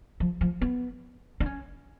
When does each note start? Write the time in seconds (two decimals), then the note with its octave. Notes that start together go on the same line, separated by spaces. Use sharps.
0.20 F3
0.41 F3
0.62 B3
1.40 D4
1.46 C#4